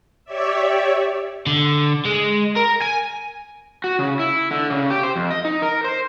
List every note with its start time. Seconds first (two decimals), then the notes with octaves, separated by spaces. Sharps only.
0.24 G4 C#5 D5 E5
1.47 D3
2.05 G#3
2.57 A#4
2.82 G#5
3.84 F#4
3.99 C#3
4.19 E4
4.51 D3
4.70 C#3
4.90 G4
5.03 C5
5.16 F2
5.31 D#5
5.45 D#4
5.62 A#4
5.84 C5